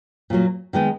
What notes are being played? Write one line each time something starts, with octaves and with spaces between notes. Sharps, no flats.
A#2 F#3 A#3
D#3 G#3 B3 D#4